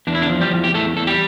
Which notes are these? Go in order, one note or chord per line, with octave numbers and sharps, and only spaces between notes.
E2 D4
E4
D3 D4
F3
G3 G4
E2
G4
E2 A3 A4
E2 A4
G3 G4